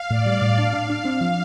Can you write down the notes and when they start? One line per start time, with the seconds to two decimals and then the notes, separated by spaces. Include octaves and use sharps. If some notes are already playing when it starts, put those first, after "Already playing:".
Already playing: F5
0.10 A2 D5
0.26 G3
0.42 A2
0.58 D4 F5
0.73 D4
0.90 D4
1.05 C4
1.21 F3